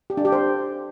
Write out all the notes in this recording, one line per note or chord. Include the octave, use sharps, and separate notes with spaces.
G4
D4
G4
C5